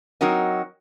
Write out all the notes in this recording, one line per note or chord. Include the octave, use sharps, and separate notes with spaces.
F#3 C4 D#4 F#4 A#4 D#5